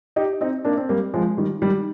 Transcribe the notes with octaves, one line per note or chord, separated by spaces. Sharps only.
D#4 G4
C4 D#4
A#3 D4
C4
G3 A#3
F3 G#3
D#3 G3
D#3 G3